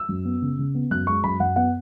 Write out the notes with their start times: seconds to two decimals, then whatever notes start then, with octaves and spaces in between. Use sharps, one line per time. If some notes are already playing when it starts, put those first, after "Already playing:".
Already playing: E6
0.09 F#2
0.25 B3
0.42 C#3
0.59 C#3
0.75 B3
0.91 F#2 F#6
1.07 G#3 C#6
1.24 F#2 B5
1.40 F#2 F#5
1.56 B3 F#5